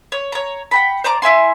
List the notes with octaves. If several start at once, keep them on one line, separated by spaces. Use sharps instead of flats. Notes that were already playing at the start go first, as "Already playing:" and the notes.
C#5
C#5 A#5
F#5 G5 B5
C5 D5 A#5 D6
E4 E5 G#5 C6